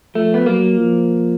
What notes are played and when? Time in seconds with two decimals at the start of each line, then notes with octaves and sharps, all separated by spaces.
0.15 F3 A3
0.34 B3
0.45 F#3 A#3
0.77 F3